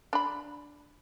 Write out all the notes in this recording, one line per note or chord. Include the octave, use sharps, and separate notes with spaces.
D4 B5